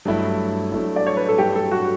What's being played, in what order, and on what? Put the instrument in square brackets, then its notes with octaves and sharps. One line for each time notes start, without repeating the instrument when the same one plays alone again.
[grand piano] G2 F#3 A3 E4
G2 F#3 A3 E4
[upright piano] D5
C#5
B4
A4
[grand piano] G2 F#3 A3 E4 [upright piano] G4
[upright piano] A4
F#4